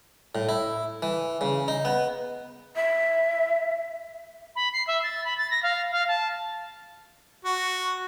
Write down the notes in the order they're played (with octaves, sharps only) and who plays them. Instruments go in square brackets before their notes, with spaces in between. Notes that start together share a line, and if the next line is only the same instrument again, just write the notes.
[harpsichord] A2
E4
E3
C#3
D#4
B3
[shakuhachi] E5
[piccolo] B5
C7
E5
A6
B5
A6
A#6
F5
F5
A5
[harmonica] F#4